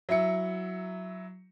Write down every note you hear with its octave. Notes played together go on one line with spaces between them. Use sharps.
F#3 E4 E5 C#7